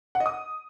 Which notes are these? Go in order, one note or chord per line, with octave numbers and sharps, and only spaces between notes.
F#5
D#5
D#6